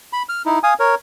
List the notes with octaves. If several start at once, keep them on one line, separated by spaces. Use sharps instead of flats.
B5
F6
D#4 E4
F5 G#5 D#6
A#4 C#5